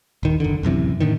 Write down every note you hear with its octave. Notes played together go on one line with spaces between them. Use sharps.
D#1 D#3
F#1 D3
D1 F#2 C3 E3
A2 D3 D#3